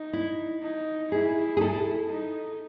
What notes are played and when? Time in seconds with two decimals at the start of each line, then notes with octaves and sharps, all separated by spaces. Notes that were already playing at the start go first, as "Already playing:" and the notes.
Already playing: D#4
0.13 E4
0.62 D#4
1.12 E4 G#4
1.57 G#4
1.61 E4 A4
2.12 D#4